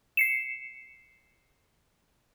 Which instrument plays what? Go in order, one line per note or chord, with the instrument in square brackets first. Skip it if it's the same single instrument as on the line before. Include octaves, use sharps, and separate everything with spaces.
[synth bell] C7 C#7 E7